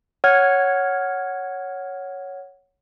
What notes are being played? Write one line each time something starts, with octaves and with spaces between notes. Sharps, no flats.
C#5 F#5 F6 G#6